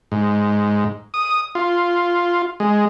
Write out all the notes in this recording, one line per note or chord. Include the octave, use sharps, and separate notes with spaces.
G#2
D#6
F4
G#3